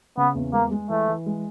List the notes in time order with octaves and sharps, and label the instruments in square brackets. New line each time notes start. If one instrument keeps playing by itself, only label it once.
[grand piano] C#3 [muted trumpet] B3
[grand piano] E2
[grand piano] G#3 [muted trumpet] A#3
[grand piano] G#3
[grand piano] E3 [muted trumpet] A3
[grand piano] E3
G#3